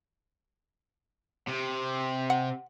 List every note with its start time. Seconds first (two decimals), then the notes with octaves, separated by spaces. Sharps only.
1.48 C3
2.30 F#5